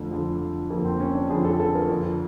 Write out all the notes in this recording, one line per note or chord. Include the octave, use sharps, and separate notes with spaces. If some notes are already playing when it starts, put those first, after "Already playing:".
Already playing: F2 D3 A3
F2 D3
F2 D3 A#3
C4
C#4
D4
F2 D3 G#4
A4
A4
A#4
F2 D3